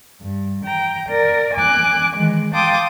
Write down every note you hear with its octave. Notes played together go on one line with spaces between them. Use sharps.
G2
G5 A#5
A#4 D5
G#5 D6 F#6
D#3 E3 G#3
F5 G5 A5 C6 D6 D#6